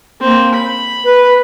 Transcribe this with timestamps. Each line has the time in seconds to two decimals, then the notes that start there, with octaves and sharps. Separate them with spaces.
0.20 A#3 C4
0.54 B5
1.04 B4